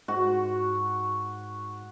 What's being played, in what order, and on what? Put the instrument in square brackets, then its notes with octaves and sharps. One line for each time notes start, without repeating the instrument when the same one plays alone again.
[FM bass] G#2 [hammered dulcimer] F#4